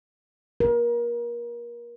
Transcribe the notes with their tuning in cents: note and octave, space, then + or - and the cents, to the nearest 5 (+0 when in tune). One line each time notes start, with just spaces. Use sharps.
A#4 +30